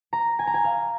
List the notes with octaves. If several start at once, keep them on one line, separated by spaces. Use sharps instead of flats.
A#5
G#5
A#5
G#5
F5